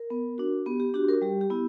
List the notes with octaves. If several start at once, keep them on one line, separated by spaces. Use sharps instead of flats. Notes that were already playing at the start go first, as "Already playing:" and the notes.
Already playing: A#4
B3
D4 F#4
B3 G4
G4
D4 F#4 G4
A#4
G3 G4
G4
B3 E4